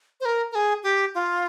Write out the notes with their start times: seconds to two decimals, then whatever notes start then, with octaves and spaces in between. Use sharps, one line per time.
0.21 C5
0.25 A#4
0.52 A#4
0.55 G#4
0.83 G4
1.15 F4